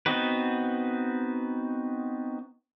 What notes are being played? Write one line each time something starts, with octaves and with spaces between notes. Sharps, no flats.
B3 C4 D#4 F#4 B4